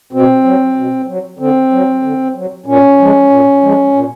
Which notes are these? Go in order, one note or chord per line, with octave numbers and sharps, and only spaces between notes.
B2 C4
F#3
B2
F#3
D3 C4
F#3
D3
F#3
A#2 C#4
F3 G#3
A#2
F3 G#3
A#2